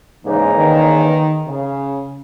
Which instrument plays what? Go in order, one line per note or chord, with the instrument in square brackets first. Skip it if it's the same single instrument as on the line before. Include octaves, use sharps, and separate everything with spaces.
[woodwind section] E2 C#3 E3 A#3 D#4 [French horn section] G#2
[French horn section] D#3
C#3